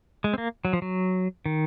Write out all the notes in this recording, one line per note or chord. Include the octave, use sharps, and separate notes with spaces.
G#3
C4
A#3
F#3
F3
F#3
D#3